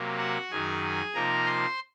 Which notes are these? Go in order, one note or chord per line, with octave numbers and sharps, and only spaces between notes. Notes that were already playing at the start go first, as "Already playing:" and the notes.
Already playing: C3 F#3 A#3
F#4 F#5
F#2 D#3 F#3 G#4 G#5
C3 F3 A#3 D#4 A#4 A#5
C5 C6